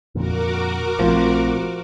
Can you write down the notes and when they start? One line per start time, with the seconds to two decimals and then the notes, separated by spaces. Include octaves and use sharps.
0.15 F2 A#2 D3 F#4 A#4 D6
0.99 A#1 F3 A3 C4